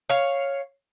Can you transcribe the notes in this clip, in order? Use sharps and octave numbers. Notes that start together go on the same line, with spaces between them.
C#5 F5